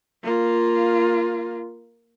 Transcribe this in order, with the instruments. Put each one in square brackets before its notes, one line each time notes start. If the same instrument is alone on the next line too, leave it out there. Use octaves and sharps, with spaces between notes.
[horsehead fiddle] A#3 F4